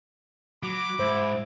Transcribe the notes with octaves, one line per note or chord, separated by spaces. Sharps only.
F#3 B5 D6
G#2 E4 C5